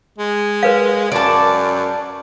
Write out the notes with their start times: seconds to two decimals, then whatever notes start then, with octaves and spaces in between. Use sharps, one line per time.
0.18 G#3
0.63 A#4 B4 F5
1.12 F#2 D5 A5